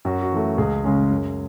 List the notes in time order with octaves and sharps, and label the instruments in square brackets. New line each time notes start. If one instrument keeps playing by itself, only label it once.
[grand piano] F#2 F#4
F#4
E3 A3
C#2 G#4
C#3 G#3 C#4
F#2